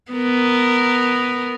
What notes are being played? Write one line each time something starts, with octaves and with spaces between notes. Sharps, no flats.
B3 A#4